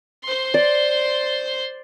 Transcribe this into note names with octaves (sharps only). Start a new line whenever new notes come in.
C5 C6
D5